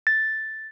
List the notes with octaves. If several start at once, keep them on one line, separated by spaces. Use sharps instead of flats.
A6